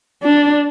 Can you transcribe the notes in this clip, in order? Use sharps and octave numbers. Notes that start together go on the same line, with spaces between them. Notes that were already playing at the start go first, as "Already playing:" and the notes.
D4